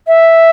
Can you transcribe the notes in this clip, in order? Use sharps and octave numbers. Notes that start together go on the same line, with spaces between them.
E5